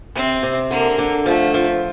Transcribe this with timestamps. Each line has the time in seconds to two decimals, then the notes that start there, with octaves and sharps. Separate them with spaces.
0.15 C3 C4
0.43 C3
0.71 D3 A#3
0.98 D3
1.26 F3 A3
1.54 F3